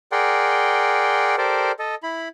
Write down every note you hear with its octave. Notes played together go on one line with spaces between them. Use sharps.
G#4 A#4 D5 F#5 G5 C6
G4 A4 A#4 C5 D5
A4 D#5
E4 B5